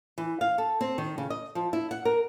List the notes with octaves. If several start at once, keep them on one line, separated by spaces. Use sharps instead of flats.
E3
F5
A4
C4
D#3
C#3
D#5
F3
E4
F#5
A#4